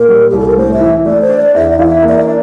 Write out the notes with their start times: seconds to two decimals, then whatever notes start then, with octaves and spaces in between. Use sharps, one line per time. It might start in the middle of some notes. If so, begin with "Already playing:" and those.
Already playing: A#2 A#4
0.09 G3
0.29 C2 G4
0.39 A4
0.48 A#4
0.57 A2 C5
0.73 E5
0.81 E3
1.06 A3 D5
1.22 C5
1.29 D4
1.37 D5
1.54 E2 E5
1.70 D5
1.79 E3 F5
1.86 E5
2.02 A#3
2.09 D5
2.18 E5
2.27 D4 D5